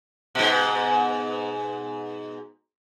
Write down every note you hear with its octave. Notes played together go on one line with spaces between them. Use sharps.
G#2 B2